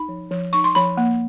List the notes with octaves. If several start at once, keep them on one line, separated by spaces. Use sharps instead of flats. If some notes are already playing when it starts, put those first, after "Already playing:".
Already playing: D#4 B5
F3
F3
D#4 C#6
C6
F3 B5
A#3